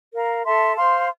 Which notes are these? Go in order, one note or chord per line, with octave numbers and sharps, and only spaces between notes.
A#4 F5 A#5
A4 E5 A5 C6
C5 F5 C6